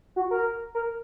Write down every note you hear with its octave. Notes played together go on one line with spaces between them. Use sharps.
F#4
A#4
A#4